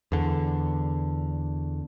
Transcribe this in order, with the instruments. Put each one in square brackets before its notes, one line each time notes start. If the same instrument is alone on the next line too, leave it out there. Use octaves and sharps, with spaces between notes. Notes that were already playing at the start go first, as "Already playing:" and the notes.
[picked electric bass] E2 D3